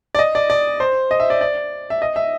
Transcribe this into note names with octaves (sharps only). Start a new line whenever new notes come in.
D5
D#5
D5
D5
C5
D#5
E5
D5
D5
E5
D#5
E5